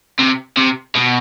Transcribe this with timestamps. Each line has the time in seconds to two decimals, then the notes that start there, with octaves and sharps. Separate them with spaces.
0.20 C3
0.57 C3
0.95 B2